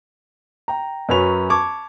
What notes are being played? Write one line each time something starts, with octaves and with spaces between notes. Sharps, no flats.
G5 A#5
F#2 F#3 C#4 B4 B5 F7
A5 C#6 D6 G#6